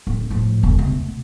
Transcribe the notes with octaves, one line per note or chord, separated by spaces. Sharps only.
D1
A2 F3
E1 C#2
B2 A3